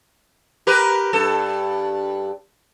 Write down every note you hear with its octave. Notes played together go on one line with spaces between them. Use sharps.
G4 A#4 B4
G2 A4